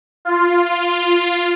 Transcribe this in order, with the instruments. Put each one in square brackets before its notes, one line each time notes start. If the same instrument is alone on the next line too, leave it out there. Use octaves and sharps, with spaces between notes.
[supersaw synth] F4